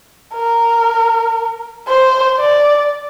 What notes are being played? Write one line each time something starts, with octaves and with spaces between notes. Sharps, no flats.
A#4
C5
D5